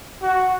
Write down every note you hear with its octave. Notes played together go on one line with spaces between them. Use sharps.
F#4